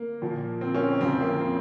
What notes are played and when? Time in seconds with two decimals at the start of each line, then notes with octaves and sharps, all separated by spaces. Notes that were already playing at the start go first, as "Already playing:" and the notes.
Already playing: A#3
0.22 A#2 F3
0.61 C4
0.74 A#3 C#4
0.87 C4
1.01 F2 C#3 F3 C4
1.21 A#3
1.40 C4